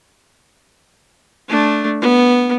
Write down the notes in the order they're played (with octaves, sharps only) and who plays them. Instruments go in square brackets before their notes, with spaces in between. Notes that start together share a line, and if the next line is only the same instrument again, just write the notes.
[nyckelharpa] A3 D4
B3